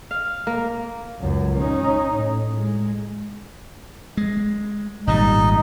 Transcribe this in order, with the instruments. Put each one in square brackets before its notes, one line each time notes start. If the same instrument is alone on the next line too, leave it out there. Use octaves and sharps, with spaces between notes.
[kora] F5
A#3
[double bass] C#2 F#2
C#4 D#4
A2
G#3
[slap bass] G#3
[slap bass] G#1 A#2 G3 [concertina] D#4 D#5